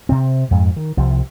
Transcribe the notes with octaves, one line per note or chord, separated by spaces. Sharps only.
C3 C4
F2 G#2
D#3
C2 C3 F3